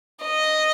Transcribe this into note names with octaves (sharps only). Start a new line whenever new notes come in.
D#5